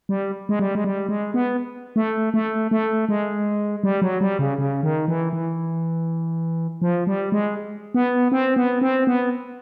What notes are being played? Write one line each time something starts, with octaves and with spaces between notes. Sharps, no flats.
G3
G#3
G3
G#3
G3
G#3
B3
A3
A3
A3
G#3
G3
F#3
G3
C#3
C#3
D#3
E3
E3
F3
G3
G#3
B3
C4
B3
C4
B3